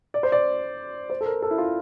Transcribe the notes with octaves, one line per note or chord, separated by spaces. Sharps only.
D5
C5
D5
C5
A4
A#4
A4
E4
F4